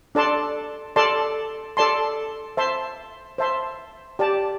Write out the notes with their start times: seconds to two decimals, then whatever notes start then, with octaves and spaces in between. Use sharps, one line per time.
0.15 D4 A4 D5 A5 C6
0.96 A4 D5 A5 C6
1.77 A4 D5 A5 C6
2.57 C5 E5 A5 C6
3.38 C5 E5 A5 C6
4.19 G4 D5 A5